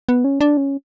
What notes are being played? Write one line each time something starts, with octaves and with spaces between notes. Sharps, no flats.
B3
C#4
D4
C#4